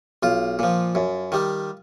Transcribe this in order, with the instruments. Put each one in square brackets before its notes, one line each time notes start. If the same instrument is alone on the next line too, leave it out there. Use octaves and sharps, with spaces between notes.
[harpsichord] B1 F4
A#2 F3
F#2
D#3 G3